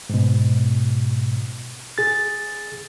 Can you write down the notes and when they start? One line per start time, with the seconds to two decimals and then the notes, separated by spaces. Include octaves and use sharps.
0.09 G#2 B2
1.98 G#4 A6